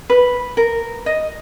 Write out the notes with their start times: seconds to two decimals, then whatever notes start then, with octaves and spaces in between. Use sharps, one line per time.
0.10 B4
0.57 A#4
1.06 D#5